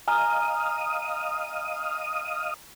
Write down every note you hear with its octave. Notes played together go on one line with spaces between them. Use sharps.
D#5 F5 G#5 A#5 D#6 F6